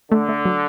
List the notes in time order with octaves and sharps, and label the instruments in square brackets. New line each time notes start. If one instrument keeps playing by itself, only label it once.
[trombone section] D3 [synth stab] A3
[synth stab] A3
F#3